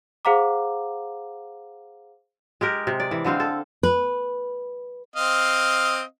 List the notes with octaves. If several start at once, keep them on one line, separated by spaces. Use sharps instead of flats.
G#4 C5 F5 F#5 A#5 D6
G#3 G4 A#4
C3
D5
E3
D3 G#3 C4 F5
A4
B4
C4 D#5 F5